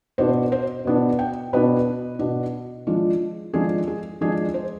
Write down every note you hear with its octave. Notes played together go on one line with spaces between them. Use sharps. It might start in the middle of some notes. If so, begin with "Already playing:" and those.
B2 B3 D4 C5
C5
B2 B3 D4
G5
B2 B3 D4 B4
B2 B3 D4
F3 G#3 D4 F4
F3 G#3 D4 F4 G#4
G#4
F3 G#3 D4 F4 G#4
C5